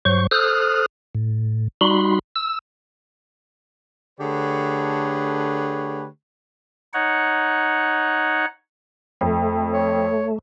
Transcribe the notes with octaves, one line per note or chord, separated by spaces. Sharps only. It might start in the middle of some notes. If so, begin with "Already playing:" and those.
G2 F#3 C5 C#6
A4 C5 D#6 F6 F#6
A2
G3 D#4 F#4 B5 C6
E6
D3 A3 G4 G#4 B4 C#5
D#4 C#5 F#5
F2 A3
C#5